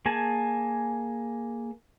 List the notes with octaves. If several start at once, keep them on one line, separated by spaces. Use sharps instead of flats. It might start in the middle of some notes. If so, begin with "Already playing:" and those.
A#3 G#4 G#5 A5